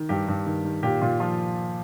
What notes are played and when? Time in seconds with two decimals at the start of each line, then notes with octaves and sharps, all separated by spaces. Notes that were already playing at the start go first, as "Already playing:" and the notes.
Already playing: D#3
0.09 G2 G4
0.28 G2
0.46 D#3
0.64 D#3
0.83 A#2 G4
1.02 A#2 F4
1.20 F3 F4